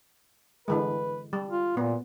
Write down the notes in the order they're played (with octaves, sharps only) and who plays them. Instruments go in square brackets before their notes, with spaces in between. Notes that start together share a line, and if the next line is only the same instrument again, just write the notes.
[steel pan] D3 E3 G#3 [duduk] B4
[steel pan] G3
[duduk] F4
[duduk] A#2 [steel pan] B3